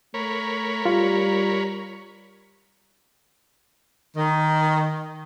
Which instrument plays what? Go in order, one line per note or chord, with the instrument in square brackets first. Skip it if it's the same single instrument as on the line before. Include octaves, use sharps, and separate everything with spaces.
[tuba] A3 [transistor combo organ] A#4 C#5 B5
[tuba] G3 [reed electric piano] F4
[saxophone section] D#3